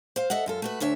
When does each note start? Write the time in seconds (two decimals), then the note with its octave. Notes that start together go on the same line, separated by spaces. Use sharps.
0.16 C5 F5
0.30 A4 D#5 E5 F#5
0.46 F#2 F4 A4
0.62 A3 F#4 B4
0.80 D2 D4 C#5 E5